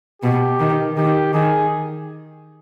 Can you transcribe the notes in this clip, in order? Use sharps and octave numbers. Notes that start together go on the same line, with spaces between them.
B2 G4
D#3
D#3 G4
D#3 G#4